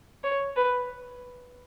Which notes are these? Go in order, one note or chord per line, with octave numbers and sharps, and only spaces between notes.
C#5
B4